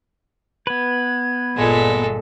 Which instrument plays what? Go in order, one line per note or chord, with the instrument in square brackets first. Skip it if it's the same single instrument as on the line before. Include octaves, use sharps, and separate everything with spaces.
[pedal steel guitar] B3 B4 [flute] G#6
[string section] G1 A#2 [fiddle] G#3 A4